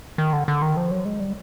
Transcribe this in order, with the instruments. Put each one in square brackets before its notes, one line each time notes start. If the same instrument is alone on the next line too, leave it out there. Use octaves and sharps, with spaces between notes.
[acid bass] D#3
D3
D3
D#3
F3
F#3
G#3
G3